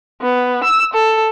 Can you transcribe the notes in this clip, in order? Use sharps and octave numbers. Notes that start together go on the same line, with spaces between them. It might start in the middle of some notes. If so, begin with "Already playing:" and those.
B3
E6
A4